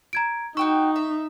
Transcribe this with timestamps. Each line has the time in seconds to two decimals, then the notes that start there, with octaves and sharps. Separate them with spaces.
0.13 A#5 G#6 D7
0.57 D#4 F#4 G5 C#6 E6
0.96 E5